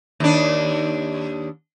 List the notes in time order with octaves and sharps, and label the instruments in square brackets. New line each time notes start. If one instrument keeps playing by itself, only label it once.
[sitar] D#2 D4